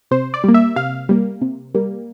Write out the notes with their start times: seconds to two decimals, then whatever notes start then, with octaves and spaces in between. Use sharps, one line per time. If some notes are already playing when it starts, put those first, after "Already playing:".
0.11 C3 C5
0.34 D5
0.44 G3 A#3
0.54 E5
0.76 C3 F5
1.09 G3 A#3
1.42 C3
1.75 G3 A#3